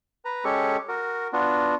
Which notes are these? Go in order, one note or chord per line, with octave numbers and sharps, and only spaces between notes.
B4 A#5
G#3 C#4 G4 A4 C#6
F#4 A#4
B3 D4 F4 F#4